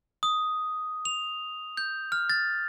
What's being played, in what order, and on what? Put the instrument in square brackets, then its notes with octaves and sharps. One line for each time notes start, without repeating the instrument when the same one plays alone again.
[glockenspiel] D#6
F7
G6
F6
A6